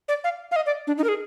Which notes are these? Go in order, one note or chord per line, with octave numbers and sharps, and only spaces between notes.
D5
F5
F5
D#5
D5
D4
D#4
A#4
G#4